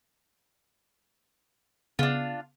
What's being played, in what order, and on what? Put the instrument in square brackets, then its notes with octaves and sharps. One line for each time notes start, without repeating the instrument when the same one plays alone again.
[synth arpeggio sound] C#3 B3 [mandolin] D4 F4